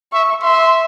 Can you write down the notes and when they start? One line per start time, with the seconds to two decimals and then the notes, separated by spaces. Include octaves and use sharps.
0.13 E5 C#6
0.43 E5 C6